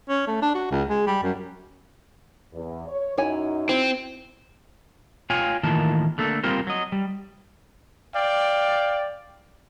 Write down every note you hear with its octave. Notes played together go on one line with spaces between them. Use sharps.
C#4
A3
D4
F#4
C#2
G#3
G3
F#2
E2
C#5
F#2 D#4 E4 C#5 G#5
C4 E4
F4 C#5 F5 G5 G#5
A2 D#3 E3 A#3 F4 A5
D3 A3 A#3 A4
G3 A#3 C4 F4 A#4 C5
F#3 D#5
G3
D5 F5 G5